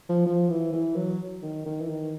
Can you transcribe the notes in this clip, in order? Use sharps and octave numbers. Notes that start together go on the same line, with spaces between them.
F3
F3
E3
E3
F#3
D#3
D#3
E3
D#3